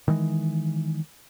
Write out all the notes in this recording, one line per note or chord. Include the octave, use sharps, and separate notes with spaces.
D#3 E3 G#3